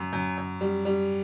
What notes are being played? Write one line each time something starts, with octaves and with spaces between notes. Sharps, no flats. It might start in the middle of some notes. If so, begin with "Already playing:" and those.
Already playing: F#2
F#2
F#2
G3
G3